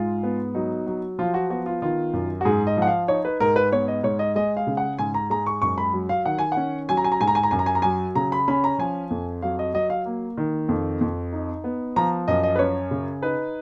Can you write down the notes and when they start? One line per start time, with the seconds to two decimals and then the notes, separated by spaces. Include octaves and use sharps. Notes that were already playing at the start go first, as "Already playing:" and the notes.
Already playing: G#2 G#3 F4
0.23 B3
0.55 F#3 D#4
0.87 F#3
1.19 F3 F4
1.34 F#4
1.50 B3 F#4
1.66 F4
1.82 D#3 F4
2.13 F#2
2.41 F#4
2.45 G#2 G#4
2.67 D#5
2.77 F3
2.82 F#5
2.87 F5
3.08 D#4 C#5
3.25 B4
3.40 G#2 A#4
3.56 B4
3.72 B3 C#5
3.88 D#5
4.03 G#2 C#5
4.19 D#5
4.35 G#3 D#5
4.57 F5
4.67 C#3
4.77 F#5
4.99 G#2 G#5
5.14 A#5
5.30 G#3 A#5
5.46 C#6
5.62 F#2 C#6
5.78 B5
5.93 F#3
6.09 F5
6.25 D#3 F#5
6.39 G#5
6.52 C#4 F#5
6.89 F#3 G#5
6.97 A#5
7.04 G#5
7.12 A#5
7.21 G#2 G#5
7.27 A#5
7.35 G#5
7.43 A#5
7.51 F#2 G#5
7.59 A#5
7.66 G#5
7.75 A#5
7.82 F#3 G#5
8.15 C#3 A#5
8.32 B5
8.48 C#4 B5
8.64 A#5
8.79 F3 G#5
9.11 F2
9.42 F#3 F5
9.59 D#5
9.74 F#3 D#5
9.90 F5
10.06 A#3
10.37 D#3
10.69 F2
11.01 F2
11.33 D#4
11.64 B3
11.96 F3 A#5
12.28 F#2 D#5
12.43 D#5
12.56 B4
12.59 C#4 C#5
12.91 C#3
13.22 D#4 B4